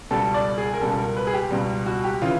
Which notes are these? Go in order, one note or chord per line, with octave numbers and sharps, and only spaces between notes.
C#2 B2 G3 A4
D5
G#4
A#4
C#2 B2 G3 A4
A4
A#4
B4
G#4
G4
C#2 B2 G3
F#4
G4
C#3 E3 F4